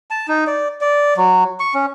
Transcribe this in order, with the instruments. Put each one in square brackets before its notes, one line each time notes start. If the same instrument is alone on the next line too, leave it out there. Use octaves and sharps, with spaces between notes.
[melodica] A5
D#4
D5
D5
F#3
C#6
C#4